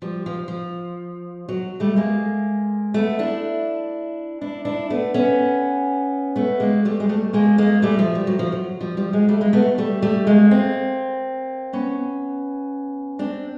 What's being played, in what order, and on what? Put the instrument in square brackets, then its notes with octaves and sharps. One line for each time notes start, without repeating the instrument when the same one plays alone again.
[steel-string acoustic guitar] F3 G3
F3
F3
F#3
G3 A3
G#3 A#3
A3 B3
D4 E4
D4 E4
D4 E4
A3 B3
B3 C#4
A3 B3
G#3 A#3
G3 A3
G#3
G3 A3
G#3 A#3
G#3 A#3
G3 A3
F3
G3
F#3
F3
F#3
F3 G3
F3 G3
F#3 G#3
G3 A3
G#3 A#3
A3 B3
G3 A3
G3 A3
G#3 A#3
A#3 C4
B3 C#4
C4 D4